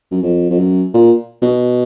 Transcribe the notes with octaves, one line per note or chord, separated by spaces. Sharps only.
F#2
F2
F2
F#2
A#2
B2